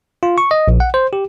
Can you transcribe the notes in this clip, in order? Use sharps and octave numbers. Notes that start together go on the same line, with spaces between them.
F4
C#6
D#5
A#1
F#5
C5
G4